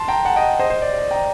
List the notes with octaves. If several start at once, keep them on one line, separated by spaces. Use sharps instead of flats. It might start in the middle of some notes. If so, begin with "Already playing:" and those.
Already playing: A5 C6
G5 A#5
F#5 A5
D#5 G5
C5 D#5
C5
D5
D5
G5 A#5